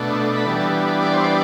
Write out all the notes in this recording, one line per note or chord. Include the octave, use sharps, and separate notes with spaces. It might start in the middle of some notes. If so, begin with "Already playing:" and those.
Already playing: B2 A3 D4
B5
E3 G3 B3 D4 A5
A5
D5
C5
D5